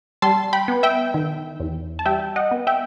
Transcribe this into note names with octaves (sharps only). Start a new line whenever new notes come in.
G3 A5 C6
G5 B5
B3
E5 G5
D#3
E2
A5
G3 E5 G5
D#5 F#5
B3
E5 G5